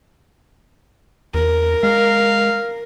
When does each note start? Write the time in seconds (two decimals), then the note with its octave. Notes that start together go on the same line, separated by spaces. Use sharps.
1.34 E2 A#4
1.83 G#3 F5